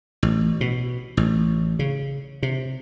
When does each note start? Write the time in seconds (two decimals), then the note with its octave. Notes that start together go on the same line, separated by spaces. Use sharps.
0.23 A1
0.61 B2
1.17 A1
1.79 C#3
2.43 C3